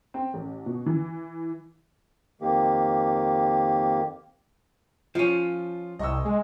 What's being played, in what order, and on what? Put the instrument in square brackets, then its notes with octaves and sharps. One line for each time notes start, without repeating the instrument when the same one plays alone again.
[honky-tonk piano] C4
A1
B2
E3
[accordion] F2 D#3 A#3 G4
[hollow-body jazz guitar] F3 C#4 [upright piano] F4
[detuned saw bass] C2 [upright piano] D#5 C#6 E6
[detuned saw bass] G#3